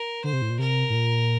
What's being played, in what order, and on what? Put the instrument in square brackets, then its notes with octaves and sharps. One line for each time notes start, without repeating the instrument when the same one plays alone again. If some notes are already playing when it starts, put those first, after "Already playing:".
Already playing: [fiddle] A#4
[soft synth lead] D3 [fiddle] C5
[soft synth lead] C3
A2
A#2
[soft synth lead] C3 [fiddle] A#4
[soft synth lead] A2
A#2